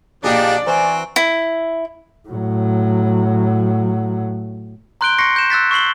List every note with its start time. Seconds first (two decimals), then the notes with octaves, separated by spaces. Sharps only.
0.24 A#2 F3 D4 D#4 G4 G#4 D5 F5
0.67 E3 C4 F#4 C5 G#5 A#5
1.16 E4
2.29 A2 F#3
5.01 A#5 C6 F#6 G6 D7 G7
5.18 C6 C#6 A#6 C7 C#7
5.36 G6 E7
5.50 E6 F#6 A6 B6
5.71 C#6 E6 C7 F#7 G7